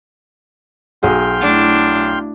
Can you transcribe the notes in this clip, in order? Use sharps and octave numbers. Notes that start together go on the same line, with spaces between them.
B1 G#4 F#5 G5 C6 F6
A3 D4 E4